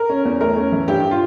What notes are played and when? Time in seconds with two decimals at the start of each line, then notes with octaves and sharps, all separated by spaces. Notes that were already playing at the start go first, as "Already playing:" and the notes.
Already playing: A#4
0.09 C#4
0.25 E2
0.41 A3 A#4
0.56 C#4
0.72 E3
0.88 G2 G4
1.11 F4